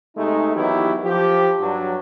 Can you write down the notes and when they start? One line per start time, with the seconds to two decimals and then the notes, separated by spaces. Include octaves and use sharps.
0.17 C3 G#3 A3 D#4
0.55 D#3 E3 F#3 B3 E4 G4
1.04 F3 G4
1.61 G2 F#3 D4